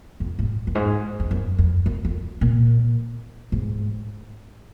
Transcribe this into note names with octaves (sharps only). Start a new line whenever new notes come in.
F2
G#2
F#2
G#2
F2
F#2
F2
F#2
F2
A#2
G#2